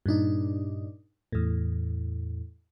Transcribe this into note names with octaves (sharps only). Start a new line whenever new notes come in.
G2 A#2 D4 D#4
E2 A2